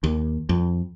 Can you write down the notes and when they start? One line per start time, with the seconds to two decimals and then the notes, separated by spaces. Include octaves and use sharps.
0.04 D#2
0.49 F2